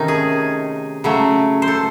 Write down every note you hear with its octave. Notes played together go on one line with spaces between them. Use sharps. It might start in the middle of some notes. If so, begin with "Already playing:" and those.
Already playing: C3 D#3 A3 C#4 D#4
G#4
C#3 F#3 A3
C5
A4